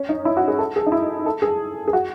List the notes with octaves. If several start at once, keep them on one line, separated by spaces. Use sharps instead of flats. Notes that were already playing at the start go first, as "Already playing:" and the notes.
Already playing: C#4
D#4
E4
F#4
G#4
A4
G#4
D#4
E4
A4
G#4
G#4
F#4